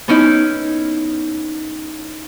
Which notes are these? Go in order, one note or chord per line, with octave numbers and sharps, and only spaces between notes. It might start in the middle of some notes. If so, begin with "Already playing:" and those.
B3 C#4 D#4 E4